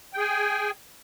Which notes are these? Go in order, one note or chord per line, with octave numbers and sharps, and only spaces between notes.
G#4 G5 G#5